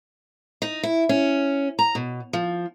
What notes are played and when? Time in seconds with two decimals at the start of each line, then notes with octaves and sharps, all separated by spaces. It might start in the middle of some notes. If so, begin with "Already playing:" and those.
0.62 D#4
0.83 E4
1.09 C#4
1.79 A#5
1.95 B2
2.33 F3